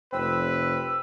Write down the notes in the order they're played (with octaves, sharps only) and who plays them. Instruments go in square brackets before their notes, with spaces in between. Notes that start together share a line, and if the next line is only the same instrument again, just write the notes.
[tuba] F1 [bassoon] C4 [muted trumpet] B4 [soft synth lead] E6